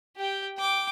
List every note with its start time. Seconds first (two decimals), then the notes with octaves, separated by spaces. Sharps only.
0.17 G4 G5
0.58 G5 D6